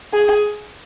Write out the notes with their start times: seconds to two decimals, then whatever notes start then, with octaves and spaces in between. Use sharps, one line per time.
0.13 G#4